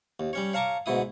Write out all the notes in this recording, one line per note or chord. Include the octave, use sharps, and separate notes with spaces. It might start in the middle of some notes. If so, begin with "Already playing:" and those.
D#2
G3 C#4 C#5
C#5 F5 A5 A#5 C#6 D6
D2 G#2 B2 E4 D#6